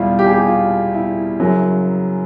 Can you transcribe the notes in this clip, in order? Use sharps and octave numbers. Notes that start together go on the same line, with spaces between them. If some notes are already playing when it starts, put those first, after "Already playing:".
Already playing: E2 B2 G3 E4 F4
G4
G#4
G4
F4
E4
F#2 C#3 F#3